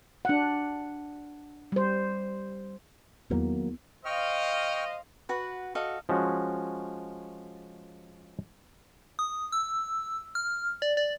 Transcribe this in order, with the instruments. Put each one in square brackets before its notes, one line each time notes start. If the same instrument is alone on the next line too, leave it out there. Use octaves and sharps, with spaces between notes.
[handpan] D4 F#5
G3 C5
[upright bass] E2 E4 [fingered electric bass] D#3 F#3 A#3
[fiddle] C5 F5 [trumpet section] D#5 [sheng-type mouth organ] G5 C#6 F6
[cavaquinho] F#4 B4 F#5
F#4 A4 D#5 F5
[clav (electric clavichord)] F3 G#3 C#4 F#4
[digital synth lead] D#6
E6
F6
D5
D5